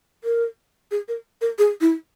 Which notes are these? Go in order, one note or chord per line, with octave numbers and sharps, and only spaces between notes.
A#4
G#4
A#4
A#4
G#4
E4